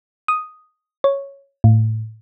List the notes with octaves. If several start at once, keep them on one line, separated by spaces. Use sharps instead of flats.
D#6
C#5
A2